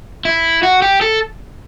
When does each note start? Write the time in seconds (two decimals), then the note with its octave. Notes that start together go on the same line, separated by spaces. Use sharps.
0.25 E4
0.63 F#4
0.82 G4
1.01 A4